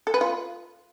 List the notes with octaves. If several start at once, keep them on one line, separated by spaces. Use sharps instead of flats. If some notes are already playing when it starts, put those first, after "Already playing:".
A4
B4
F4